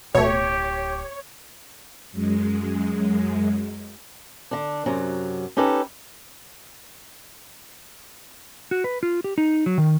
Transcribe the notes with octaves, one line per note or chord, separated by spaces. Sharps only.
D1 B2 A3 E4 G4 C#5
F#2 G#3
D3 D4
F#2 C3 F#3
C#4 D#4 G4 A4 B4
F#4
B4
F4
G4
D#4
F#3
D#3